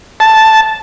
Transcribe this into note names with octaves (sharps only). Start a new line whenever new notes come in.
A5